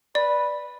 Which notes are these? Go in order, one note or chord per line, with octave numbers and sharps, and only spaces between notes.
B4 D5